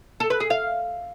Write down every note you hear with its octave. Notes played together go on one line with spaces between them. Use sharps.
A4
B4
G#4
F5